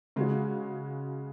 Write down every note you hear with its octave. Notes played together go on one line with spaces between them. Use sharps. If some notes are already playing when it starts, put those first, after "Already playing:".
C#3 G#3 C#4 F#4